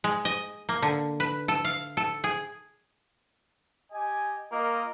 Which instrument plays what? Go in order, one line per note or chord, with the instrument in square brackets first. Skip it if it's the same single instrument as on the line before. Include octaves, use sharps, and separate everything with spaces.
[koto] G#3
D#5
A#3
D3
B4
A4
F5
A4
G#4
[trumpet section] G4 D#5 G#5
[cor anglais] A#3 [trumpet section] F4 A#4 D#5